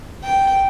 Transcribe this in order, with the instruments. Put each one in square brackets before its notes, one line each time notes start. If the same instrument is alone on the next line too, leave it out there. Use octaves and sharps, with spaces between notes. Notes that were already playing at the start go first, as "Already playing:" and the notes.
[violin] G5